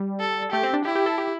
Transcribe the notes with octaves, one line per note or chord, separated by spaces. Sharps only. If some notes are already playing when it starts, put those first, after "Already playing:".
Already playing: G3
A4
A3 G4
C4
D4
E4 G4
G4
A4
G4